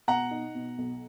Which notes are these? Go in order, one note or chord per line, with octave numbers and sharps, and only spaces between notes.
B2 F#5 A#5
D#4
B2
B1